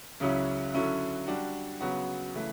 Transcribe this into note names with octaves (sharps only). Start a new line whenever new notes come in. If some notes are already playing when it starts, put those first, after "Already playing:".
C#2 C#3 F#3 C#4 E4
D3 F#3 C#4 E4
G3 D4 F#4
C#3 F#3 B3 F#4
C#3 E3 A3